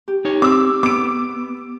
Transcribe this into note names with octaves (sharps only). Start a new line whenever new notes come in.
G4
D#4 C#5
C4 D6 E6
B3 D6 D7